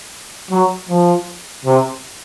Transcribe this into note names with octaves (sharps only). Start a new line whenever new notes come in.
F#3
F3
C3